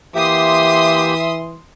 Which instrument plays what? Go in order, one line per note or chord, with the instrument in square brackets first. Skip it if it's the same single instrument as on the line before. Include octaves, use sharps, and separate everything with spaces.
[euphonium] E3 [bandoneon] A#3 G4 [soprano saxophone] E5 [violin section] C6 D#6